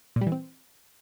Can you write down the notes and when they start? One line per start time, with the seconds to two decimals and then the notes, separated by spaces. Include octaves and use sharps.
0.16 A#2
0.21 G3
0.27 E3
0.32 C4